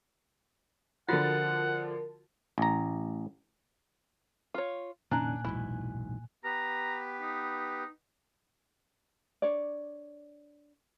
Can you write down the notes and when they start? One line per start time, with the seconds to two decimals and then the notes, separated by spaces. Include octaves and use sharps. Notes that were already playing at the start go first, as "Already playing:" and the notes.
1.09 D3 F3 F4 F#4 A#4 F#5 A6
2.58 A1 A#5
4.54 F4 C#5
5.11 F1 A#2 D#3 C#4 D4 G#5 A#5 F#6
5.44 E1 B1 G#2 E4
6.44 B3 G4 B4 A#5
7.21 D#4
9.42 D4 C#5 D5